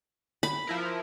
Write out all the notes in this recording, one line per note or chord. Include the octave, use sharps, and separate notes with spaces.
B5
F3 E4 A#4